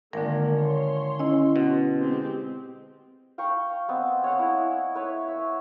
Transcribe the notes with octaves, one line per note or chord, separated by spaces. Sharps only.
G#1 D3 A#3 A#4
C#5 C6
C#4 E4 D#5
B2
G#3 C4 G4
F5 G5 A#5 C#6
B3 C4 D#5
C#5 F5 F#5 G#5
E4 D#5
B4 C#5 E5
E5